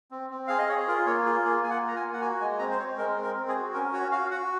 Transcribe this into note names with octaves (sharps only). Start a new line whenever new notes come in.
C4
C4
G#4 F5
D#5
G#4 C#5
F4 A#4
A#3 C#5
F4 G#4
A#3 G#4
A#3 G#5
F#5
F4
A#5
G#5
A#3
F#5
F#4 G#5
G#3 G#5
C4 A#5
C5
C4 C#5
G#3 A#4
C4
A#4
C4
G#4
F#4
C#4 A#4
F#4 C#5
F#4 F5
F#4 F#5